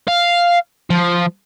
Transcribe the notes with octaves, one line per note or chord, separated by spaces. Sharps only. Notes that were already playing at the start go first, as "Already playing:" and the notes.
F5
F3